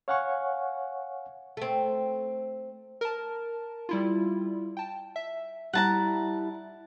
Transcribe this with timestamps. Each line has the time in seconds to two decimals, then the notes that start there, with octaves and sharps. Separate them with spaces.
0.08 C#5 F5 F#5 G#5 C#6
1.57 A3 C4
3.01 A#4 A5
3.89 G3 E4 F4
4.77 G5 A5
5.16 E5
5.73 G3 E4 F#5 A5 A#5